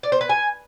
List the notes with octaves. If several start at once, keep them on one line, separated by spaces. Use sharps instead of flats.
D5
C5
B4
G#5